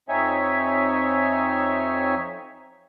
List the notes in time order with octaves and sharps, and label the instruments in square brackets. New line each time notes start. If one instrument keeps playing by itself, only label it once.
[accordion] F2 C4 D#4 C#5 E5 G#5